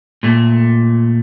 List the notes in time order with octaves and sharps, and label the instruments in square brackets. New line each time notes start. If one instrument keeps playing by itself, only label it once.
[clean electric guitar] A#2 A3